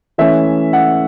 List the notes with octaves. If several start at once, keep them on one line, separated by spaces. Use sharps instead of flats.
E3 A3 C#4 E5
F#5